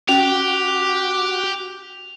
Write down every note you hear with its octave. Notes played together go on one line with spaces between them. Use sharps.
C#4 F#4 G4 F7